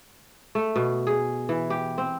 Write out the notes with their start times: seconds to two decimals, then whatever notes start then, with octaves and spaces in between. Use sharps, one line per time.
0.55 A3
0.76 B2
1.07 G#4
1.49 E3
1.70 G4
1.98 C4